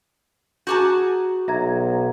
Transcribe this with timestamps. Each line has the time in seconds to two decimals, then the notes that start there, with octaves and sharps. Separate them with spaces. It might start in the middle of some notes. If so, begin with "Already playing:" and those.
0.67 F#4 G#4 A5 A#5 D6 G6
1.48 B1 E5 A#5 G#6